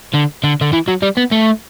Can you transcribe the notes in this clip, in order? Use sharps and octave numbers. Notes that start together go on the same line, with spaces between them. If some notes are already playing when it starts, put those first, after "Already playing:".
D3
D3
D3
E3
F#3
G3
B3
A3